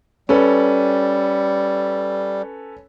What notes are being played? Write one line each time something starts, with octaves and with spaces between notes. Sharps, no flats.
G3 C#4 A4 B4